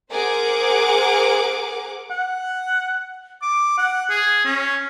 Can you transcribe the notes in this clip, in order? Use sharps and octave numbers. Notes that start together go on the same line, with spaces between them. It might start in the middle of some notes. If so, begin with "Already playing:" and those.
G#4 A#4 C5 F#5 D6
F#5
D6
F#5
G#4
C#4